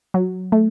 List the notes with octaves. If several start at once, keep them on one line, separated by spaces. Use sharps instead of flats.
F#3
A3